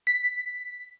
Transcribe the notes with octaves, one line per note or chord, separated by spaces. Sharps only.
B6